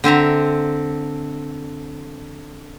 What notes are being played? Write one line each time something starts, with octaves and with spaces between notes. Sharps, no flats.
D3 C4 E5 A#5